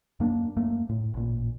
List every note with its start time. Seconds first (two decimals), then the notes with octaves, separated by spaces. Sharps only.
0.20 F#2 A#3 C#4 D4
0.57 F#2 A3 A#3
0.89 A2
1.14 A1 A#2